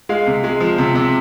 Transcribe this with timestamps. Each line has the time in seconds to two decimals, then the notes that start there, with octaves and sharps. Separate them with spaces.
0.09 G#3 F5
0.27 C3
0.44 G#3
0.60 F3
0.78 C3
0.95 C3